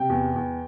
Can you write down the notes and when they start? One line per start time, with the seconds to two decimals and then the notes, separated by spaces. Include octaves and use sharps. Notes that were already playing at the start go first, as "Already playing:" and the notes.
Already playing: C3 G5
0.09 E2
0.36 E2